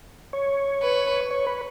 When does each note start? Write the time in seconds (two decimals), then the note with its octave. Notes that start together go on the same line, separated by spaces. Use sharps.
0.33 C#5
0.82 B4
1.31 C#5
1.47 B4